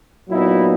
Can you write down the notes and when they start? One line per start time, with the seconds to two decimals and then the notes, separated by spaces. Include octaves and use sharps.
0.29 A#2 F#3 B3 D#4 E4